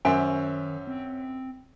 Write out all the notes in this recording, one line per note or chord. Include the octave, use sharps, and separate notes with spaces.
F#2 D#3 C#4 C5 E5 G#5
C4